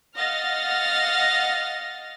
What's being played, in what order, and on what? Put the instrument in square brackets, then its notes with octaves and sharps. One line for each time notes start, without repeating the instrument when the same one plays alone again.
[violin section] D#5 F5 F#5 F6 A6 A#6